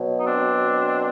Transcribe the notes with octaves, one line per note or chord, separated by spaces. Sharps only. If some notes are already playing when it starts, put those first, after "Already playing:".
Already playing: B2 F#3
D#4
C4 D4